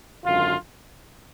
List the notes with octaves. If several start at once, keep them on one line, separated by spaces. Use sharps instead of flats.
G#1 F#2 D3 F4